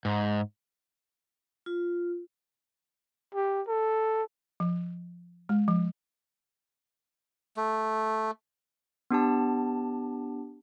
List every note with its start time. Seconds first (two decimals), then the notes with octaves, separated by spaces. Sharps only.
0.05 G#2
1.66 F4
3.34 G4
3.68 A4
4.60 F3
5.49 G#3
5.68 F3
7.57 A3
9.10 B3 D4 G4 A5